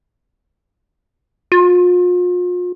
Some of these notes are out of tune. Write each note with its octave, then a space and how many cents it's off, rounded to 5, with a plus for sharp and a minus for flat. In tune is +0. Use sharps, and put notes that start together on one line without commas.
F4 +40